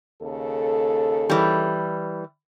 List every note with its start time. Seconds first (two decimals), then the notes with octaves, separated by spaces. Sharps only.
0.22 D#2 C#3 A4
1.30 E3 G3